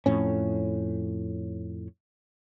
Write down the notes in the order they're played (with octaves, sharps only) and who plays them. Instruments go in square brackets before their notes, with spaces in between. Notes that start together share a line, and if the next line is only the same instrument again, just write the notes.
[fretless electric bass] F2 A2 C#4